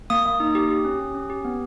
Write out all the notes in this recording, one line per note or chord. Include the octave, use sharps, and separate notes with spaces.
A#3 D#6
A#3
D#4
G4
G4
C#4
G4
C#4
G4
B3